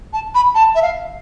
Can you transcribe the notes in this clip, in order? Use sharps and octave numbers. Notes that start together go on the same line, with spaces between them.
A5
B5
A5
E5
F5